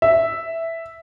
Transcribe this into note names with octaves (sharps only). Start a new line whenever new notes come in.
E5